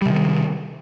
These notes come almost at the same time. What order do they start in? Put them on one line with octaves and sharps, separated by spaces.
G3 C3 D#3